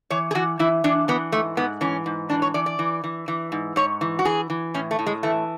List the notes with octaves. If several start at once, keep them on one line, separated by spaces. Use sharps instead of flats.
E3 C#5
G#4
E3 F#4
E3 E4
E3 D4
E3 B3
G#2 A3
G#2 B3
E3 C#4
G#2
E3 D4
C#5
E3 D5
D5
E3
E3
E3
G#2
G#2 C#5
E3
F#4
E3 G#4
E3
A2 C#4
A3
A2
G#3
E3 A3